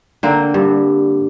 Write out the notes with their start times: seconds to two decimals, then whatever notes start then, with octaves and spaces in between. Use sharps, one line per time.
0.23 D3 A#3 C4
0.54 G2